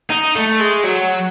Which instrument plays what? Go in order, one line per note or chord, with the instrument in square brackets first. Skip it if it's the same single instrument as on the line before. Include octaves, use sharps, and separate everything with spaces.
[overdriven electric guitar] D#4
A3
G#3
F#3